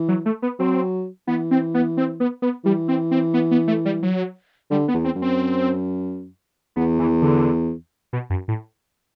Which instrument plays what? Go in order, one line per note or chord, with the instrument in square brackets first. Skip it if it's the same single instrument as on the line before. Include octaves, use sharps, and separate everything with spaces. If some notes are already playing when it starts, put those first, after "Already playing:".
Already playing: [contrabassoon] E3
[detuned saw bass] F#3
A3
B3
[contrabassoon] F#3 [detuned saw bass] C4
[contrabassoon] E3 [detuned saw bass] B3
[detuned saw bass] C4
B3
C4
B3
B3
[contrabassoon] E3 [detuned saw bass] G3
[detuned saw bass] C4
C4
B3
B3
A3
G3
F#3
[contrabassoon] D3 [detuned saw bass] G3
[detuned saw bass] B3
[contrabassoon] E2
[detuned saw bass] C4
[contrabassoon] F#2
[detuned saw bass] C4
[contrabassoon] E2 [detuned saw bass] B3
[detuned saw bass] E3
D3
B2
F#2
A2